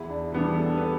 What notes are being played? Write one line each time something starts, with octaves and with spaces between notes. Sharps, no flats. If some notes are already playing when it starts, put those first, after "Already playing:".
Already playing: E2 E4
D4
E3 G3 B3 D4
G4
A4
B4